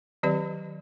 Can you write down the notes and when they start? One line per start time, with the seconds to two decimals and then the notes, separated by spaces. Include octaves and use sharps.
0.23 D#3 F#3 C4 G4 D5